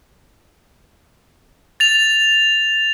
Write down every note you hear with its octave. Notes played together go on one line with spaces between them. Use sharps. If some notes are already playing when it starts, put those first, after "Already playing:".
A6 F7